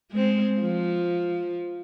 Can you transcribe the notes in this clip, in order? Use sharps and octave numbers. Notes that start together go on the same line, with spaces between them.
G#3 C4
F3